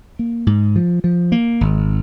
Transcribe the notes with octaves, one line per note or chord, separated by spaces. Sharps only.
A#3
G#2
F3
F3
A#3
G#1